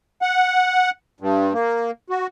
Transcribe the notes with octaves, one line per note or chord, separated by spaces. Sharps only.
F#5
G2
A#3
F#4